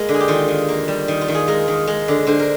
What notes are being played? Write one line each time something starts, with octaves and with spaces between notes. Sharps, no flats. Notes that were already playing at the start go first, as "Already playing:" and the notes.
Already playing: G#3 A#3 A#4
D3
G#4
G4
D#3 F4
D#3
A#3
G3
D#3
F4
D#3
G#4
G#3 A#4
D#3
G#3
D3
D3 C5
A#4